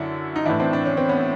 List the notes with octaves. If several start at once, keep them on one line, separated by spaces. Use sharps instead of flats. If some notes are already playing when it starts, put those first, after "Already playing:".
Already playing: F#2 D3 D4 E4
D#4
A2 E3 D4 E4
C4 D4
D4
C#4
C4
B3 C#4